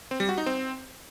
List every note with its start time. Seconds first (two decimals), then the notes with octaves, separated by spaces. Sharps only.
0.11 C4
0.20 G3
0.29 F#4
0.38 D#4
0.46 C4